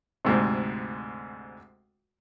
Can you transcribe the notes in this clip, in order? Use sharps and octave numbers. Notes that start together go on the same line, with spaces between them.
D2 G#2 C3